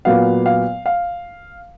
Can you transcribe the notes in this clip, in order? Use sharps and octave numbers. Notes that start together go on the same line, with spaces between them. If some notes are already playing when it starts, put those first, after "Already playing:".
A#2 F#3 B3 F5
F5
F5